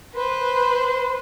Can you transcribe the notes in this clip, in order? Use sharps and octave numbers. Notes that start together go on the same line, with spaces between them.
B4 C5